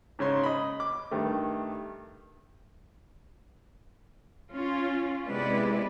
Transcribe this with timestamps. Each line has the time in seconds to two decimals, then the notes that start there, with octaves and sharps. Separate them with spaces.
0.19 G#2 C#3 C#5 C6
0.43 D#5 B5
0.80 D6
1.11 G2 D#3 A3
4.52 C#4 F4
5.26 C3 G#3 B3 E4 B4 D5